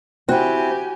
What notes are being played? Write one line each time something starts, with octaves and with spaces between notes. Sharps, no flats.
C4 E4 F#4 G4 G#5